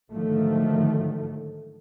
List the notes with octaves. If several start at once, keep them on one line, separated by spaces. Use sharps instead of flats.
G#2 D3 D#3 F3 F#3 A3